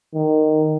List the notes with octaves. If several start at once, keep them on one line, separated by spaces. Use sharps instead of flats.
D#3